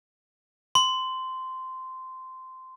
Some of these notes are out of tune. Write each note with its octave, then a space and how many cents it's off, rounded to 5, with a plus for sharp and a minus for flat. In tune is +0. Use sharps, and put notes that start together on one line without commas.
C6 -15